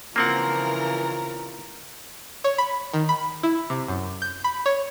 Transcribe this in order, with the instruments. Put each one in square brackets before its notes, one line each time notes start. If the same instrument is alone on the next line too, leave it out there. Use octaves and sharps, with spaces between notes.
[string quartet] C#3 E3 F3 [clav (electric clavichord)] A#3 C4 F#5 [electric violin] A#4 A#5
[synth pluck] C#5
B5
D#3
B5
E4
C3
F#2
G6
B5
C#5